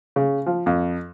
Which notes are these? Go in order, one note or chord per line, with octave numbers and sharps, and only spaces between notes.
C#3
F3
F2